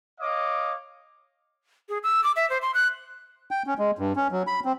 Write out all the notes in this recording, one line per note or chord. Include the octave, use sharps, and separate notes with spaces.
C#5 D#5 F5 D6
G#4
E6
D6
E5
C5
C6
F#6
G5
C#4
G#3
G2
C#4
F#3
B5
C4